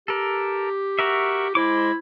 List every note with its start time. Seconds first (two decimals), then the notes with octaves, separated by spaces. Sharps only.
0.08 G4 A4 A#4
0.99 F#4 A#4 E5
1.55 G#3 E4 C5 D6